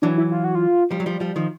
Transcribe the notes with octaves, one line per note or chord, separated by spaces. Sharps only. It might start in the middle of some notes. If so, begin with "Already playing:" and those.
E3 F#3 D4
E4
F4
F#4
F4
F3 G3
F#3
F3 G3
F3 G3
D#3 F3